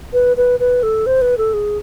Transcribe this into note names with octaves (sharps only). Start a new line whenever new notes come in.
B4
B4
B4
A4
C5
B4
A4
G#4